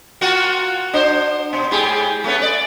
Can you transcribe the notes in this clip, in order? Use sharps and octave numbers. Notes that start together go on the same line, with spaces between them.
A#3 F4 F#4
D4 C5
B2
G#2 G4 G#4
A3 B3 C#4
D5